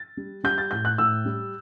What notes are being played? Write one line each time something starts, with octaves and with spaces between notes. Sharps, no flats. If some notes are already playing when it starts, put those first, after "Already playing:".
Already playing: A6
G3
G3 G6
A6
A2 G6
F#6
A2 E6
G3